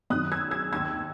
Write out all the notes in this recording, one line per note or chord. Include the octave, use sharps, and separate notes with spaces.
F#2 D#3 D#6 F#6
E6 G#6
E6 G#6
D#2 D#3 E6 G#6